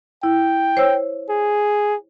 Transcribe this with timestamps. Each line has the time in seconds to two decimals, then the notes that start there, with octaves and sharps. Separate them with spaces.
0.23 E4 G5
0.77 C5 C#5 E6
1.29 G#4